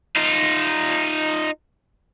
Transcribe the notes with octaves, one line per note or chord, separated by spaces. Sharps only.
D#4 F4